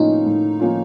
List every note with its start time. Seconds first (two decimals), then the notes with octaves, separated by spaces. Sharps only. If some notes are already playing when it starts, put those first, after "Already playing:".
Already playing: A2 F3 A#3 C#4 D#4 F4
0.26 A2
0.60 F3 A#3 C#4 F4